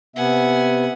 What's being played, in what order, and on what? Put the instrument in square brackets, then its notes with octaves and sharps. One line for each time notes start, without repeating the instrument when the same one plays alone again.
[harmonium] C3 B3 E5 [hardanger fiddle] F#5 G#5